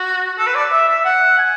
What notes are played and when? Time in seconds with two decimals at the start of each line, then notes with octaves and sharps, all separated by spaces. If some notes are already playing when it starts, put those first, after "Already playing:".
Already playing: F#4
0.38 A4
0.47 B4
0.55 D5
0.71 E5
0.88 E5
1.05 F#5
1.38 G#5